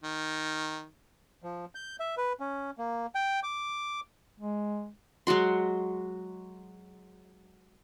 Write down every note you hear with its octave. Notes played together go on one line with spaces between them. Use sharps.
D#3
F3
G6
E5
B4
C#4
A#3
G5
D6
G#3
F#3 G#3 F#4 C6